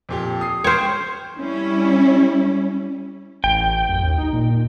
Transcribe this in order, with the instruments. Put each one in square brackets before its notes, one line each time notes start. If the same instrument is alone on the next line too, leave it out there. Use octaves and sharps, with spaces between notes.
[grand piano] F2 A#2 G4
D#6 C7
[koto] C5 C#5 [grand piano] G5 C6 F6
[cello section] G3 C#4 E4
[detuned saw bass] A1 [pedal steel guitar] G5
[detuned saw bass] F#2
D#2
D#4
A#2